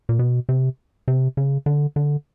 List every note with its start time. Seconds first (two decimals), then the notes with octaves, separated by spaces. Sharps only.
0.09 A#2
0.19 B2
0.49 C3
1.08 C3
1.37 C#3
1.66 D3
1.96 D3